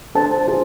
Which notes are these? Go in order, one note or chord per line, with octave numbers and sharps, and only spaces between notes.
D4 A4 C5 A5
F4 G#4 C5